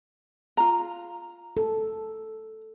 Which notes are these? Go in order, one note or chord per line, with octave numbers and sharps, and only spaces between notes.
F4 A#5
A4